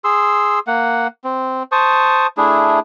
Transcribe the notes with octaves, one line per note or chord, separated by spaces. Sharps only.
G#4 C6 E6
A#3 F#5
C4
C5 A5 C#6 D#6
A3 D4 E4 G#4